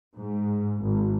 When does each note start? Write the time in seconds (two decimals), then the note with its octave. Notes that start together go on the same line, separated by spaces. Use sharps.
0.16 G#2
0.83 G#1